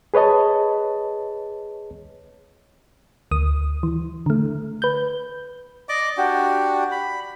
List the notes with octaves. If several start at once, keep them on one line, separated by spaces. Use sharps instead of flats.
G#4 B4 C#5 D#5 A5
D2 D#6
E3
D3 A3
B4 G6
D5 D#5 D6
D4 F#4 G4
B5